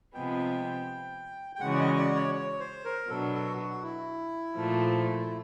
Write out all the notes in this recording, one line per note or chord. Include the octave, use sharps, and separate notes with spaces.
C3 F3 G#3 B3 G5
G5
C#3 E3 G#3 C#4 F#4 F#5
D5
D#5
D5
C#5
C#5
C5
A#4
B2 F#3 B3 D4 A4
F#4
F#4
E4
A#2 F3 A3